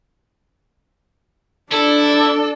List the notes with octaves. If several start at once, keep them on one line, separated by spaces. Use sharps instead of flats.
D4 E4 A4 D5